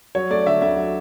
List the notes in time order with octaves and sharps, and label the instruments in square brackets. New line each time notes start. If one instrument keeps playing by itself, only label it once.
[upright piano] F#3 C#5
A3 D5
D3 E5
D2 E5
F#3